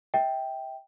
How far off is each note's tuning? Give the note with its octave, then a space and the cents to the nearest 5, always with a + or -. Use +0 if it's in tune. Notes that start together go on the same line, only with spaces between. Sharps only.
E5 -30 G5 +0